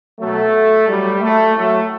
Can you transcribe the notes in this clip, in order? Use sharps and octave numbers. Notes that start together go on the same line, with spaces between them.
B2 F#3 A3
A2 F#3 G3
A3
A2 F#3 A3